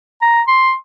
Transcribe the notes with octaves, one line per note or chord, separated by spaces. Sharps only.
A#5
C6